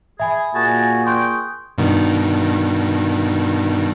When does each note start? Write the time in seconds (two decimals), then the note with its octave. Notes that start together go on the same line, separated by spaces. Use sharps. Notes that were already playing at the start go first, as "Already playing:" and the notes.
0.20 G#4 E5 G#5 B5
0.54 A#2 F#4 G#4 A5
1.06 G#4 G5 C6 C#6 F#6
1.78 G2 B2 D#3